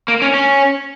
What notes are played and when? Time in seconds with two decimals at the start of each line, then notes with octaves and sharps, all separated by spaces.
0.08 A#3
0.22 C#4
0.34 C#4